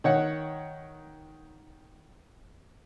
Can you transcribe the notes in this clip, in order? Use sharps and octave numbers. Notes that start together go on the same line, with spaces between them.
D#3 C#5 F#5